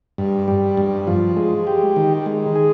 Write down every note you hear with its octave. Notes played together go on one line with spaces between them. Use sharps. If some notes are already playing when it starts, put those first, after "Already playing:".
G2
G3
G2
F3
G#3
G4
D#3
G#3
G#4